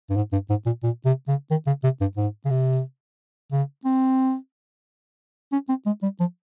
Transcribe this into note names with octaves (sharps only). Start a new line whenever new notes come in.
G2
G#2
G2
G#2
A#2
A#2
C3
C#3
D#3
C#3
C3
G2
G#2
C#3
C3
C#3
C4
C#4
C4
G#3
G3
F3